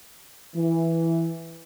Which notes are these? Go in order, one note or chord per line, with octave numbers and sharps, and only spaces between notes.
E3